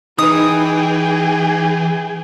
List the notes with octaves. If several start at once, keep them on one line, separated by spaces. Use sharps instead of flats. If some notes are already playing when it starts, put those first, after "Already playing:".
E3 D#4 G#4 B4 G5 D#6